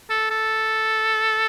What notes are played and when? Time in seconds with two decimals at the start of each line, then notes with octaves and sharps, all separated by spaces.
0.10 A4
0.30 A4